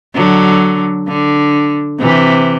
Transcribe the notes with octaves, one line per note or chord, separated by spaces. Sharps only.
D3 F#3
D3
C3 E3